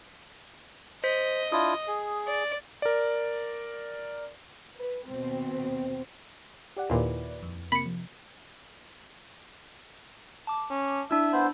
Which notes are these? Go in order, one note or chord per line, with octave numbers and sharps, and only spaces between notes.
C5 D#5 B6
D4 E4 F4 D#6
G#4
D5
A#4 D5
B4
D#2 B2 C4
G4 D5 F#5
D#2 A#2 E4 B4 D5
F2
C3 A#3 B5 C#7
F3
A5 D6
C#4
D4 E4 E5 E6
B3 C5 B5 G6